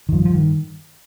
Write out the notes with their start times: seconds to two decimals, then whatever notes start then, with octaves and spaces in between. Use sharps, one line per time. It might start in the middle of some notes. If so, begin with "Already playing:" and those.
0.09 D#3
0.12 G2 F3
0.25 F3
0.34 D#3